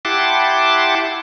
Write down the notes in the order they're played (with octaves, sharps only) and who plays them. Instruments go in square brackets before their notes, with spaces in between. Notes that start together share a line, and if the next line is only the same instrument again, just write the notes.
[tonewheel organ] E4 G4 F#5 A5 C6 D6